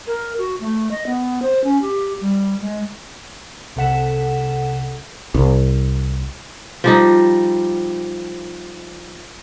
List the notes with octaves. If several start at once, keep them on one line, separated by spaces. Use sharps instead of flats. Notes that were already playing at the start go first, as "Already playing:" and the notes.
A#4
F#4
A3
D#5
B3
C5
C#4
G4
G3
G#3
C2 C3 A4 F#5 B6 E7
C2
F3 G3 D#4